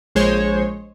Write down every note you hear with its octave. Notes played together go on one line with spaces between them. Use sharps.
A#1 G#3 C5 C#5